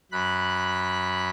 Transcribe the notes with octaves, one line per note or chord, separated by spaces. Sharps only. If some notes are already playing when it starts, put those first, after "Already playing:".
F#2 B5 F#6